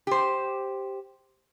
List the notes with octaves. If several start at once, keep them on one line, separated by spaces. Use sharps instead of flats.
G4 C5